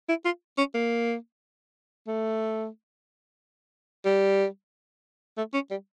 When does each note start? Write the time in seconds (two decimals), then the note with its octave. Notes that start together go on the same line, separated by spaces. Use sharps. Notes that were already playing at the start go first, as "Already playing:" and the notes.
0.09 E4
0.25 F4
0.58 C#4
0.75 A#3
2.07 A3
4.05 G3
5.37 A3
5.54 C#4
5.71 G3